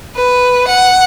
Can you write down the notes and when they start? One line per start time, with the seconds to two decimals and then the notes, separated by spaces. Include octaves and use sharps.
0.15 B4
0.68 F#5